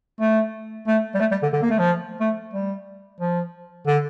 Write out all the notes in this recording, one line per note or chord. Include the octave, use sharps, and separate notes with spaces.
A3
A3
G3
A3
G3
D3
D3
A#3
A3
F3
A3
G3
F3
D3